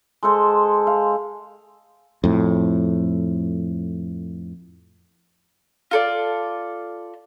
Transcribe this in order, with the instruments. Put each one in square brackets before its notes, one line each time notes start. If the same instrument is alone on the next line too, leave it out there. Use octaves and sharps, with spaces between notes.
[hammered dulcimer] G#3 A4 C5
F5
[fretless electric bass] F2 A2
[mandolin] F4 A4 D5